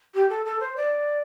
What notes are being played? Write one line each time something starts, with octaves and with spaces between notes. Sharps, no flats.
G4
A4
A4
C5
D5